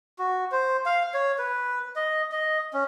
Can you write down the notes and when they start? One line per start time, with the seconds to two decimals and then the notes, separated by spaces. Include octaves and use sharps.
0.19 F#4
0.52 C5
0.86 F5
1.14 C#5
1.38 B4
1.96 D#5
2.32 D#5
2.73 C#4